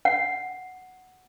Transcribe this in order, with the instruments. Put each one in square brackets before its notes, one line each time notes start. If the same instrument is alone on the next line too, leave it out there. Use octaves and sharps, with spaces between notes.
[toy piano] F#5